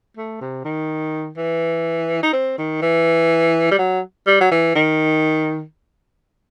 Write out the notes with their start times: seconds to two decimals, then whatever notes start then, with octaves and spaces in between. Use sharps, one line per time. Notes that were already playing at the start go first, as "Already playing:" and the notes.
0.17 A3
0.41 C3
0.65 D#3
1.37 E3
2.23 D#4
2.33 C4
2.58 D#3
2.82 E3
3.71 G3
3.78 F#3
4.27 G3
4.41 F#3
4.51 E3
4.76 D#3